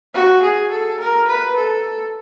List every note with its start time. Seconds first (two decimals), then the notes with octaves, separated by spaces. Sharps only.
0.14 F#4
0.43 G#4
0.71 A4
1.00 A#4
1.28 B4
1.56 A4